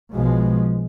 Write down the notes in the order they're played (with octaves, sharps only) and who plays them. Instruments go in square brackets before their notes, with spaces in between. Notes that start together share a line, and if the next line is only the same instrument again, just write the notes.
[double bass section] B1 B2 F3 G#3